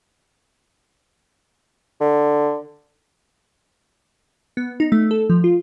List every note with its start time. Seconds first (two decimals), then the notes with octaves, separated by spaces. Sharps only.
2.00 D3
4.57 B3
4.80 D#4
4.92 A3
5.11 A4
5.30 F3
5.44 F4